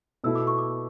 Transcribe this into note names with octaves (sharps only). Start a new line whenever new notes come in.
B2 A3 E4 E6
D6
C#6
D6